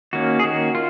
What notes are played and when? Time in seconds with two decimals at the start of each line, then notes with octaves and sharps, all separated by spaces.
0.13 D#3 A#3 C#4 F#4
0.39 G#4
0.44 D#3 A#3 C#4 F#4
0.75 F4